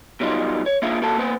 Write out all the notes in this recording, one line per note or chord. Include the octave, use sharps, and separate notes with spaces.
B2 F#3 G3 D#4 F4
C#5
A#3 D4 F4 G#4 E5 F5
A#3 F#4 A4 F5 A5
A#3 B3 C5